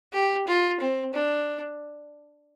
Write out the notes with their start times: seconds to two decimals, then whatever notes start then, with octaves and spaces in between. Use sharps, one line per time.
0.13 G4
0.47 F4
0.80 C4
1.13 D4